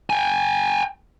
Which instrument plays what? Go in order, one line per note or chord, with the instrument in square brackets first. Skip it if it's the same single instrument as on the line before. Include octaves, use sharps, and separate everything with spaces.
[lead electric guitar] G5 G#5